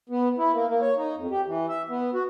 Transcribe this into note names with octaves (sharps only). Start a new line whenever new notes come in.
B3
E4
A#3
A#3
C#5
D#4
F2
G4
E3
E5
B3
F#4